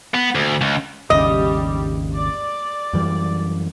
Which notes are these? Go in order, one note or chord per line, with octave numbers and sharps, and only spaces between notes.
B3
D2
C#2
G#1 D#2 C#3 G3 G4 D#5
D5
F#2 E3 G3